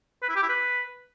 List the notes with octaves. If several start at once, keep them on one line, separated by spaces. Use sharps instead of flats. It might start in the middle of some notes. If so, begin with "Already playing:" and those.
B4
E4
G4
E4
B4